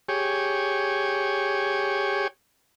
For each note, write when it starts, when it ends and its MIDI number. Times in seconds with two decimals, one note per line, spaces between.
0.09 2.28 67
0.09 2.28 68
0.09 2.28 73